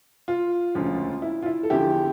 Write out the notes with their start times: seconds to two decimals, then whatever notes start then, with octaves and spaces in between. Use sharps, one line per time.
0.28 F4
0.75 E1 D2 C#3 F3
1.22 E4
1.42 F4
1.46 E4
1.63 A4
1.70 E2 D3 F3 E4 G4